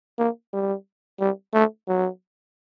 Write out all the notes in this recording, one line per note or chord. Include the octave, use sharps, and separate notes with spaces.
A#3
G3
G3
A3
F#3